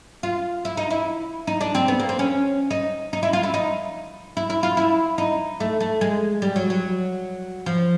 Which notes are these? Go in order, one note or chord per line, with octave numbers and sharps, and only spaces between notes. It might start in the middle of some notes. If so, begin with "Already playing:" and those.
F4
E4
D#4
E4
D#4
D4
C4
B3
A#3
C4
C#4
D#4
D#4
E4
F4
E4
D#4
E4
E4
F4
E4
D#4
A3
A3
G#3
G3
F#3
F#3
F3